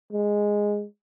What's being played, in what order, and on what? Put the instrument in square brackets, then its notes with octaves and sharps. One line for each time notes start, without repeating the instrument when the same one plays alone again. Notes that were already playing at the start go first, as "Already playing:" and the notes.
[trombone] G#3